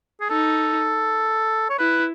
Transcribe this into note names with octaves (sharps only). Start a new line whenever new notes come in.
G#4
D#4 A4
C#5
E4 B4